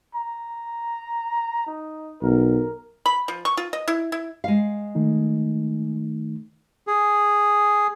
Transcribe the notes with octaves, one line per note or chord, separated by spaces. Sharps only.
A#5
D#4
B1 A#4
B5
F3
C#6
F4
D#5
E4
E4
G#3 F5
D#3 A3 D#4
G#4